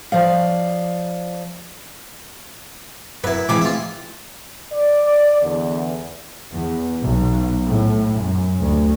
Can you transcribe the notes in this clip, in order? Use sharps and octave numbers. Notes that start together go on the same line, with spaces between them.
F3 D5 F5
F#2 E4 B4
E3 F3 G#3 C4 B5 D6
F4 E5
D5
E2 D3
E2
B1
A2
F#2
D2